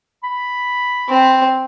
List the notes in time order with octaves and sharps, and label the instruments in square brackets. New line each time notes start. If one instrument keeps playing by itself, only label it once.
[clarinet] B5
[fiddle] C4